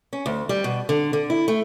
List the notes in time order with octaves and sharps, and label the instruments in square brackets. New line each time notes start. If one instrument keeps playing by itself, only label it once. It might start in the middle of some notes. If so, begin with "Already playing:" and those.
[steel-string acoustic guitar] C#4
D2
G3
B2
D3
D3
E4
A3